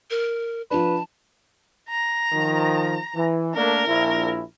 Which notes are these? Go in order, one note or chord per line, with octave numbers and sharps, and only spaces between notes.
A#4
F3 D4 B4 A5
A#5
D#3 F3
E3
A3 A#3 D4 A#4
A#1 E4